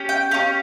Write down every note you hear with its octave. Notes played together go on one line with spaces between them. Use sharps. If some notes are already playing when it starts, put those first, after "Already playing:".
Already playing: C#4 G4
G5
C#4 G4 F5